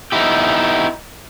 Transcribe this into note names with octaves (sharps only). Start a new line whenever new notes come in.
B3 D#4 E4 G4